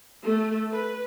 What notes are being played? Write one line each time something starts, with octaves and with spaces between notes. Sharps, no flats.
A3
B4